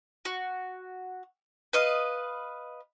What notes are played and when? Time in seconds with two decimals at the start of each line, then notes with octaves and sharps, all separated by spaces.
0.25 F#4
1.73 B4 D#5 F5